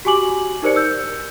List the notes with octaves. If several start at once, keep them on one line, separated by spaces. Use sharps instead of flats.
F#4 G4 G#5 D6 F#7
D#4 G4 A#4 C5 D5 C#7
E6 G6